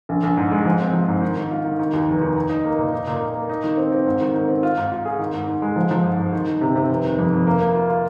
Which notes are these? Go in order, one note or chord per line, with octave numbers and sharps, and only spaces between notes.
A#1
A#1
G#2
G#3
F3
C4
F3
G#2
D#3
D#3
F4
D#3
D#3
D#2
F1
D#3
D#4
D#4
A#3
A#2
D#4
A#2
A#3
A#3
D#4
D#3
C4
C4
G#2
D#3
D#3
C4
F4
G#2
F4
G#4
D#3
G#2
G#2
G#3
F3
F3
G#2
G#2
D#3
D#3
C3
C3
F1
D#3
F2
F2
A#3
A#3
F4
F4